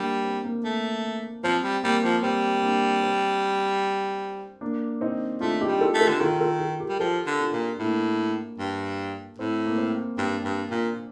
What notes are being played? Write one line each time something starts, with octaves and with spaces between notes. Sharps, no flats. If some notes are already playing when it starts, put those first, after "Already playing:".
Already playing: G3 A#3 D4
C4
A#3
A3
F3 C4
G3
G3 A#3
F3
G3 C4
A#3 D4
C4
A#3 D4
C4 D#4
A3 D4 F4
D#4 G4
G3
F4 A4
A3
F4 A4
D3
D#3 F4 A4
A#4
F4 A4
F4 A4
G4 A#4
G3
F3 F4 A4
D3
D4 F4
A#2
A2 A#3 D4
G2
A2 C4
A#3
C4
G2 A#3 D4
G2
A#2